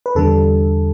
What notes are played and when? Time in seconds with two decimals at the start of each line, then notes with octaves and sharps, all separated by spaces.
0.06 B4
0.15 E2 D3 G3 A4